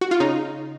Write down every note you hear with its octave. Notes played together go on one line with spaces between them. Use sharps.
F#4
F4
C#3 D#4